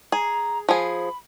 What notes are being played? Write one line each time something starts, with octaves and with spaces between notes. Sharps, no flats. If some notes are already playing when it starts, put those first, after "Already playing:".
G#4 A#5
F3 G#4 B5